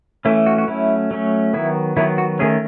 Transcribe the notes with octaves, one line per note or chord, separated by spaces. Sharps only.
E3 A3 C#4 E4
F#4
F#4
F#3 A3 C#4 E4
F#3 A3 C#4
D#3 F#3 B3 E4
D#3 F#3 B3 E4
F#4
D#3 A3 C#4 G#4